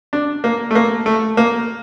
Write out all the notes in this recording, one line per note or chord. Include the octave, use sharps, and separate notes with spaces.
D4
A#3
A3
A#3
A3
A#3